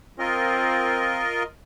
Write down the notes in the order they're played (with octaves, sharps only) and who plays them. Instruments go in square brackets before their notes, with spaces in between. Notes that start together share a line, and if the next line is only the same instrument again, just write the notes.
[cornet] C4 [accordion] F4 A#4 D#5